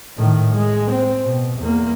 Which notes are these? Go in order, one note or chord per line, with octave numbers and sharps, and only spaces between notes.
A2 D#3
G#3
C4
B2
E2 A#3